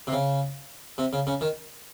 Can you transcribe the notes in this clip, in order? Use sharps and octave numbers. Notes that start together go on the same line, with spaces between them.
C3
C#3
C3
C#3
C#3
D#3